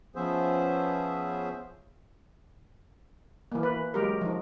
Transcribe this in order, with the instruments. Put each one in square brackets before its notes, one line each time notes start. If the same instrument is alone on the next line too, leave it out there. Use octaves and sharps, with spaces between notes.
[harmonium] F3 B3 C#4 G#4 C5 E5
[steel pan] E3 A#3
B4
F#3 G#3 G4 A#4
F3 D#4